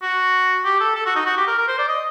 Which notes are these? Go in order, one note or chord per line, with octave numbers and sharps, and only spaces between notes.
F#4
G4
A4
A4
F#4
D#4
F#4
G4
A#4
A#4
C5
D5
D#5